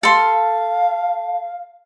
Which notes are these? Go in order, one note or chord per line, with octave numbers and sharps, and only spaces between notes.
A4 F5 C6